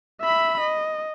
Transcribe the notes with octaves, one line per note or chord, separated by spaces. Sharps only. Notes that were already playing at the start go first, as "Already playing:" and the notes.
E5 B5
D#5